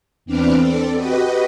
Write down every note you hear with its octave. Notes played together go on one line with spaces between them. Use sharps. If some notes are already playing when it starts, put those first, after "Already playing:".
E2 C4 D4 B4 D6 F6
C4 A4 D5
F#4 G4 B4 D#5